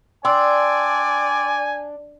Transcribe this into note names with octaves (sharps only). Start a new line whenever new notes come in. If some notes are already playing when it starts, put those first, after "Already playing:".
D4 D5 G5 G#5 C6 E6